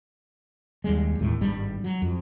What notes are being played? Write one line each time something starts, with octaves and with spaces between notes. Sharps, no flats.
D#2 G3 G#3
E1 D#2 A2
G#1 G2 G3
F#3
F2